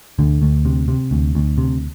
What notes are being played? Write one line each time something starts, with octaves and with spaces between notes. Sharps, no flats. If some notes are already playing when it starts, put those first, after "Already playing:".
D2 D3
D2
C3
C3
D2
D2
C3